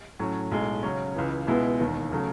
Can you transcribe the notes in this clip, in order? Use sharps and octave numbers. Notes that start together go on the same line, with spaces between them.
A2 F#3 C#4
B1 A2 G#3
C#3 F#3 C#4
C#2 C#3 E3
C#2 B2 G#3 B3 E4
E1 D#2 D#3
C#3 F#3 A3